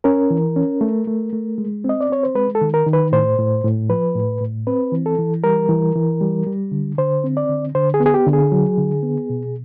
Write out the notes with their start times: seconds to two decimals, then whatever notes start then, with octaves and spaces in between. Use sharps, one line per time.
0.04 C#4 A#4
0.31 E3
0.56 C#4
0.81 A3
1.07 A3
1.33 A3
1.58 G#3
1.84 C4 D#5
2.01 D5
2.10 C4 C#5
2.23 C5
2.35 G#3 B4
2.55 A4
2.61 D#3
2.74 A#4
2.86 D#3
2.93 B4
3.12 A2 C5
3.38 A2
3.64 A2
3.89 F3 B4
4.15 A2
4.41 A2
4.67 C4 B4
4.92 E3
5.06 A4
5.19 E3
5.44 G3 A#4
5.69 E3
5.95 E3
6.21 G3
6.46 G3
6.72 D3
6.98 D3 C5
7.24 C4
7.37 D5
7.49 D3
7.75 D3 C5
7.94 G#4
8.00 B3
8.06 G#4
8.14 G4
8.26 D3
8.33 G#4
8.52 F#3
8.78 D3
9.03 B3
9.30 B2